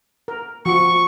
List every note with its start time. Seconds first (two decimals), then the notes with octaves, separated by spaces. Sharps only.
0.28 A#4
0.66 F3 F#4 C#6